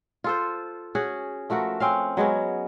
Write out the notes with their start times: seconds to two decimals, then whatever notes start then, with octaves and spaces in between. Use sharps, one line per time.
0.24 F4 A4 C5
0.95 C#4 F#4 G#4 F#5
1.50 F3 A3 F#4 A#4
1.80 C4 C#4 F5
2.17 F#3 G#3 B3 C#4